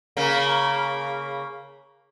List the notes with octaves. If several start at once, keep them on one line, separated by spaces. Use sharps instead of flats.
C#3 A#3